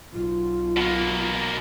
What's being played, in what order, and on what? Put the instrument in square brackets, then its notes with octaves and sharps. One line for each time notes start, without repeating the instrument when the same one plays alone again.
[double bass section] B1 [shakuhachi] F4
[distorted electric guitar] B2 A#3